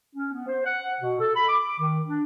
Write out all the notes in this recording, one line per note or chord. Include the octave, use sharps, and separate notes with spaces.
C#4
B3
C5
F#5
B2
A4
B5
D6
D#3
D4